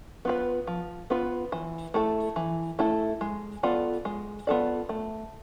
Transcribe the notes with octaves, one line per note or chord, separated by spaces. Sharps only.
B3 F4 B4
F3
B3 F4 B4
E3
A3 E4 A4
E3
A3 E4 A4
G#3
B3 F4 A4 D5
G#3
B3 F4 A4 D5
A3